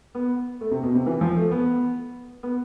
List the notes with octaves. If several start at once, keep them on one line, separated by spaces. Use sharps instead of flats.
B3
A3
C3
B2
C3
E3
F3
A3
B3
B3